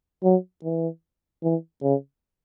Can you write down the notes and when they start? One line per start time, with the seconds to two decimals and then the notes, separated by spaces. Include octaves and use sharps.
0.24 F#3
0.64 E3
1.43 E3
1.82 C#3